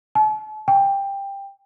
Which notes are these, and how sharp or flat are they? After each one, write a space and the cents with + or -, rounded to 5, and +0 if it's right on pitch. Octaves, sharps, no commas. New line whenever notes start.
A5 -40
G5 +15